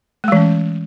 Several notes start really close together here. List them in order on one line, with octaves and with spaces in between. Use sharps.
A3 G#3 E3 C#4